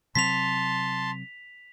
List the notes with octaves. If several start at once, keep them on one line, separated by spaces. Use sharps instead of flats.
C3 F#3 C4 A5 C6 B6 F7